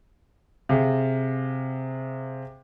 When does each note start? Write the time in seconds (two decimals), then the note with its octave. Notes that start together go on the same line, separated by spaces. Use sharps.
0.69 C3 G#4 F5